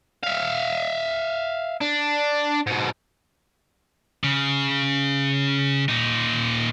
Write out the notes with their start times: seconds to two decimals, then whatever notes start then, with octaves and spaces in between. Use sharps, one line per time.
0.24 E5 F5
1.81 D4
2.67 G#2 B2
4.24 C#3
5.89 A#2 D#4